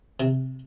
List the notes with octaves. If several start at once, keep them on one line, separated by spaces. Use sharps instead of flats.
C3